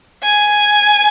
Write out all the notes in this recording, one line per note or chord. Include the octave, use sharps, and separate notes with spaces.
G#5